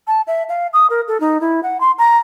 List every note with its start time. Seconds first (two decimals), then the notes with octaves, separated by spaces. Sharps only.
0.07 A5
0.27 E5
0.49 F5
0.73 D#6
0.90 A#4
1.08 A4
1.20 D#4
1.41 E4
1.63 F#5
1.81 C6
1.98 A#5